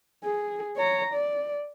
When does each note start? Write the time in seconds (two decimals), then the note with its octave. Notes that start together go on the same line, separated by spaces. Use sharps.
0.24 G#4
0.77 C#5 A#5
1.13 D5